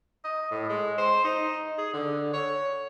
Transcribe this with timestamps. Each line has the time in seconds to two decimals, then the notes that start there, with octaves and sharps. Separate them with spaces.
0.25 D#5
0.51 A2
0.69 G#3
0.98 C5
1.24 D#4
1.78 G#4
1.94 D3
2.34 C#5